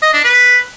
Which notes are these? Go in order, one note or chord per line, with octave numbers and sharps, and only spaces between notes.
D#5
D4
B4